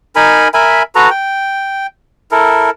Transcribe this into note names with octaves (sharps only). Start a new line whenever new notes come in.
D#4 A#4 G#5 B5
A#4 E5 G#5 B5
F#4 A4 B4 A#5
G5
E4 A4 A#4